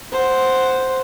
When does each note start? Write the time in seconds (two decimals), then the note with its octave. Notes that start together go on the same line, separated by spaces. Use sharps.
0.12 C5 F#5